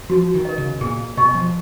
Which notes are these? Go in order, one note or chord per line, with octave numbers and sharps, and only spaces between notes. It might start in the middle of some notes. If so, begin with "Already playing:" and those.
F3 F#4
D#3
A#4 D#5
C#3
A#2 G#4
B2 D#5 G#5 C#6
F3